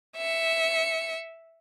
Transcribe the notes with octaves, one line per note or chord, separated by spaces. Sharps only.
E5 C#7